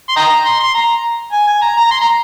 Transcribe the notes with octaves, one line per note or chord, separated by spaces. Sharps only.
C6
D#5 G5 A#5
C6
C6
A#5
G#5
G#5
A#5
A#5
C6
A#5